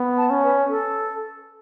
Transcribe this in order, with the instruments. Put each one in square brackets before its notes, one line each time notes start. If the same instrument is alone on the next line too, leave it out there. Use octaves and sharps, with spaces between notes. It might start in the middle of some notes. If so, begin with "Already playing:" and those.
Already playing: [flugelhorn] B3
[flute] A5
[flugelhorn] C#4
[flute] B4
A4